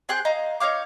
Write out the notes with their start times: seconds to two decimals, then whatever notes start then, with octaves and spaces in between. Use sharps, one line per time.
0.09 C4 G#4 G5 F#6
0.25 D#5 F5 A#5
0.60 D#4 C#5 F5 D6